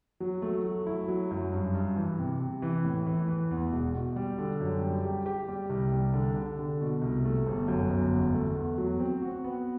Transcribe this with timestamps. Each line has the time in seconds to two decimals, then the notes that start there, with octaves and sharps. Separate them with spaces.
0.20 F#3
0.42 A3
0.64 F#3
0.86 E4
1.08 F#3
1.31 F#2
1.53 G2
1.75 G2
1.96 E3
2.19 C3
2.40 C3
2.62 E3
2.84 A2
3.07 E3
3.28 E3
3.51 E2
3.72 E1
3.94 B2
4.16 G3
4.38 D3
4.61 F#2
4.82 G3
5.05 G4
5.26 G4
5.48 G3
5.70 C2
5.92 G3
6.14 D3
6.36 D3
6.59 D3
6.81 B2
7.02 C2
7.25 A3
7.46 G1
7.68 F#2
7.90 G1
8.12 E2
8.34 A3
8.56 E2
8.78 F#3
9.00 C4
9.22 F#4
9.44 B3